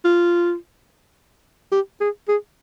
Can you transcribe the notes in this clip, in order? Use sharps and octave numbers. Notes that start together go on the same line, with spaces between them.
F4
G4
G#4
G#4